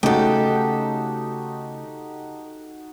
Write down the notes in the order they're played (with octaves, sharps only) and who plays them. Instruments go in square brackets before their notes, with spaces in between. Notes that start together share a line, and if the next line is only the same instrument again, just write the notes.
[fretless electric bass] C#3 A3 [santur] D#4 F#4 [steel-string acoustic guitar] G4 A4